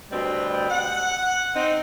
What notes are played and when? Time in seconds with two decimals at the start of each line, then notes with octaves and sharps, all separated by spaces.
0.11 D2 B2 G3 C4
0.70 F#5
1.55 C4 D#4